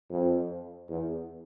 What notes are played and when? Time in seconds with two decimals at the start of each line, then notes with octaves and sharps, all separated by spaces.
0.10 F2
0.89 E2